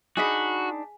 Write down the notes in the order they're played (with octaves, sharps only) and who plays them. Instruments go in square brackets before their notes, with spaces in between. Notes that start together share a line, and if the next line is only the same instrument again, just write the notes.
[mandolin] D4 D#4 B5 [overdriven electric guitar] F#4 [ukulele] G#4